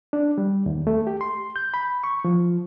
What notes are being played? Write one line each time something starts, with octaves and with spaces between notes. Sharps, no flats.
D4
G3
D#2
A3
G4
C6
G6
B5
C#6
F3